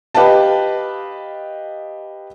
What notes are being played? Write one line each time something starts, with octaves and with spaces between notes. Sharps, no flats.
G4 B4 D#5 F5 A5